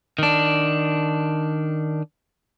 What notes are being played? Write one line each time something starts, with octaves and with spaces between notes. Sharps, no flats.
D#3 D4